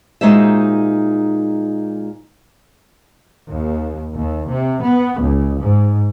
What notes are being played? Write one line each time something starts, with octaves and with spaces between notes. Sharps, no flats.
A#2 G#3 D#4 F#4 C5 E5
D#2
D#2
C3
B3
C#2
G#2